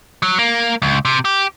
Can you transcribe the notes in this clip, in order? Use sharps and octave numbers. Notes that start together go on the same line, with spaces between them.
F#3
A#3
C#2
C3
G4